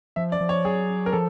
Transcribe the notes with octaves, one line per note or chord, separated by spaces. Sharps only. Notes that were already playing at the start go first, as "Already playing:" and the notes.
F3 E5
D5
F3
C#5
F#3 G#4
A#4
F3 A4